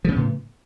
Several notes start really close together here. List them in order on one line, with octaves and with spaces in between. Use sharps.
F3 C#3 B3 A2